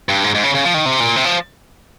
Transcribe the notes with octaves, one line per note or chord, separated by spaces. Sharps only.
G2
G#2
G#2
C#3
C#3
F3
D#3
C3
A#2
C3
F3